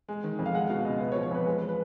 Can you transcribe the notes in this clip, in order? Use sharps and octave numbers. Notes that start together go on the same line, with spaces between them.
G#3
D#3
F2
F5
G#3 F#5
B2 F5
C#2 D#5
B3 D#5
C#5
F3
C#5
F2 B4
G#3 B4
F3
B4